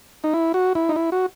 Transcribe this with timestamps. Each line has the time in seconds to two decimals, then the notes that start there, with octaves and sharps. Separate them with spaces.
0.24 D#4
0.33 E4
0.54 F#4
0.75 E4
0.89 D#4
0.96 E4
1.12 F#4